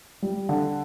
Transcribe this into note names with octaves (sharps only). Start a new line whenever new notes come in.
G3
D3